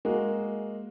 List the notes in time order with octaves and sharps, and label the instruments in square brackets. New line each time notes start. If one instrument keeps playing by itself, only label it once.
[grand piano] G#3 A#3 F#4